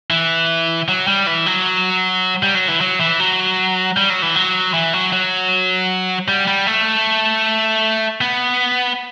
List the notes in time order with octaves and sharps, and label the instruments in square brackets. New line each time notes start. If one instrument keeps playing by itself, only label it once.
[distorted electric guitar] E3
F#3
G3
E3
F#3
G3
F#3
E3
F#3
E3
F#3
G3
F#3
E3
F#3
E3
F#3
F#3
G3
G3
A3
B3